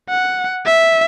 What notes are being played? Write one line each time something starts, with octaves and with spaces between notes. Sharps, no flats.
F#5
E5